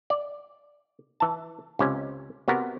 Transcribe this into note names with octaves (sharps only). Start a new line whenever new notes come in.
D5
E3 A5
C#2 C3 C#4
C3 B3 F#4 A#4